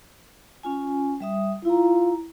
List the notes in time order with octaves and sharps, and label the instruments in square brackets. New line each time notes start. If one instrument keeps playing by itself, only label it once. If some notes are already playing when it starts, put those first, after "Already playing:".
[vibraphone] C#4 F4 G#5
G3 E5 D#6
[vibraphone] E4 A#5 [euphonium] F4